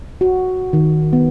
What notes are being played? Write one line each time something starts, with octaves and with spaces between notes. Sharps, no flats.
F#4
D#3
B3